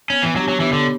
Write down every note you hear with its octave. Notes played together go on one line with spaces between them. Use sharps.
B3 C#4
E3
F#3 D4 G4 C#5
F#3
E3 B3
D3